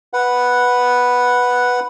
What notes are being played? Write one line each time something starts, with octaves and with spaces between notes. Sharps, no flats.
B4 F#5